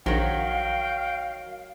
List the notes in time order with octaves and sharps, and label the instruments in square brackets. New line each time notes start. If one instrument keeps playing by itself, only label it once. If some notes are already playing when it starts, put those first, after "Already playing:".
[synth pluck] A#1 [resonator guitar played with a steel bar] D#3 F#3 [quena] F5 [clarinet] G5